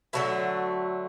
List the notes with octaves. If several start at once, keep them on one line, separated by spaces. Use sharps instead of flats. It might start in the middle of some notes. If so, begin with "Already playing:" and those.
D3 F#3 A3 B3